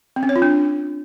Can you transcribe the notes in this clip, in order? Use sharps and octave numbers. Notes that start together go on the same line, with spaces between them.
C4
C#4
C#5
F4
D4